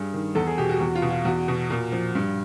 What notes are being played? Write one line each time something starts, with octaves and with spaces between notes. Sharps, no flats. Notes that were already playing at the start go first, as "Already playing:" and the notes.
Already playing: G2 G#4
D#3
E2 A4
G#4
B2 G4
F#4
E2 F#4
F4
B2
F4
E2 F#4
B2
A#2
F3
G2